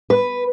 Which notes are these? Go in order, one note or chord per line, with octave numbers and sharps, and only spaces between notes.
B4